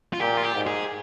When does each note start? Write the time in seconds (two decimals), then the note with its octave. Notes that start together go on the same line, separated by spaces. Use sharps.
0.13 F4
0.20 A#2 G4
0.37 F4
0.43 G4
0.55 G#2
0.67 G#4